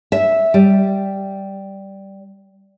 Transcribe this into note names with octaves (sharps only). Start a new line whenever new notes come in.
E5
G3